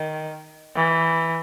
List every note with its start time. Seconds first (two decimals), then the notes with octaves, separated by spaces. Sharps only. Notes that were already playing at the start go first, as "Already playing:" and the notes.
Already playing: D#3
0.76 E3